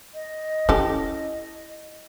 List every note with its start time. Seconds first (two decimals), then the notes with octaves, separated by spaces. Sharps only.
0.14 D#5
0.69 C#4 E4 G4 A4